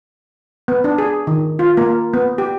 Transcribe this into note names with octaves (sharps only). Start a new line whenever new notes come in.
B3
D4
G#4
D#3
F4
A#3
B3
G4